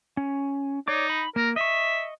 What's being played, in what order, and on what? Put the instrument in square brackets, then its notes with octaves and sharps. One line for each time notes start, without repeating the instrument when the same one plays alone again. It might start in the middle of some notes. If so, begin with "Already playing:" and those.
[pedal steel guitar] C#4
[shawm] D#4 [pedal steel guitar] C#5 D5 D6
[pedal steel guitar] B5
[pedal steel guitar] A#3 [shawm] A#4
[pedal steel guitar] D#5 C#6 [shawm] E5